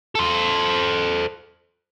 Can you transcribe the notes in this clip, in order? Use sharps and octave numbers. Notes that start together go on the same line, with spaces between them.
A4 C5